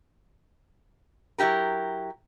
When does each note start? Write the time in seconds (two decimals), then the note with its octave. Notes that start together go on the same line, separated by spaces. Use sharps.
1.38 F#3 E4 F4 G4 A#4